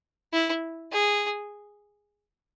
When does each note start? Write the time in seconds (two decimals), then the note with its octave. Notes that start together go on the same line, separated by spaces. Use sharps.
0.33 E4
0.92 G#4